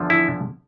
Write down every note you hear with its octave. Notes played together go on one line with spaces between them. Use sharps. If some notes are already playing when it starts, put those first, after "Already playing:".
Already playing: E2 D3 F3
E4